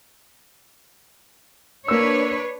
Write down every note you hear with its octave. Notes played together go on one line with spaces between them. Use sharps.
A#3 D4 B4 C#5 E6